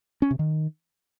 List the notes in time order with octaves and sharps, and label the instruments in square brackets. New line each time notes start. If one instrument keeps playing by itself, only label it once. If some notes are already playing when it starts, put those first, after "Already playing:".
[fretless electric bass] C#4
C3
D#3